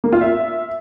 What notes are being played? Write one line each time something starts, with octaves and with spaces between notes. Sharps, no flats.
A#3
F4
E5